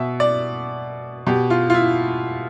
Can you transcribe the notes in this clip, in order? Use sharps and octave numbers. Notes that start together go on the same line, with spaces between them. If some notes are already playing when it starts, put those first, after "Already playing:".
Already playing: B2 E5
D5
B2 G4
F4
F4
E4